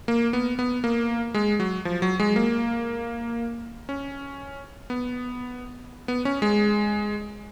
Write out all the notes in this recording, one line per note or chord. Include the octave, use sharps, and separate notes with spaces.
A#3
B3
B3
A#3
G#3
F#3
F3
F#3
G#3
A#3
C#4
B3
B3
C#4
G#3